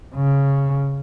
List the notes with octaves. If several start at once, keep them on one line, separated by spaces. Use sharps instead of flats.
C#3